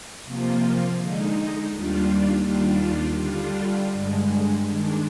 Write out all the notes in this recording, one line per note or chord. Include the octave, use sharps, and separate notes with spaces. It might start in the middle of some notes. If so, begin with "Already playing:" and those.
C3 F3 A#3 F4
D3 G#3 D#4
D#2 D#3 G3 D4 F4
D#2 D#3 G3 D4 F4
D3 G3 D4 F4
G2 D3 G#3
D#3 G#3 D4